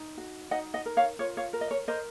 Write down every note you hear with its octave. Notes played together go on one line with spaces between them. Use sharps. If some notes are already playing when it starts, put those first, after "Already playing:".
Already playing: D#4
F#4
D#4 D#5 F#5
D#5 F#5
A#4
C#5 F5
F4 C#5
C#5 F5
A#4
D#5
C#5
A#4 C5 D#5